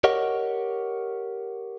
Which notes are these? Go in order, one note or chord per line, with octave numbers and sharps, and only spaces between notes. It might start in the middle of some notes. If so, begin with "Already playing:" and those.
G4 A#4 C#5 D#5 F#5